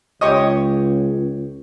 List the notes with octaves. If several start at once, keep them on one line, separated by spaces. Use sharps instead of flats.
C#2 G4 C#5 D#5